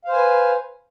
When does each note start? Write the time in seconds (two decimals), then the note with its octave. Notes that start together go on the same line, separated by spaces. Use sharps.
0.05 F5
0.08 C5
0.12 G#5
0.16 B4